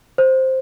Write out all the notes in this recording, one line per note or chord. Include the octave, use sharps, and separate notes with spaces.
C5